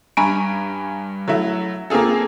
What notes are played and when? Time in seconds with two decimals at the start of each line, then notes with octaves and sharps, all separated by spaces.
0.17 G2 G#5 A#5 B5 C#6 D7
1.28 F#3 A3 E4
1.90 A#3 C4 F4 G#4 A4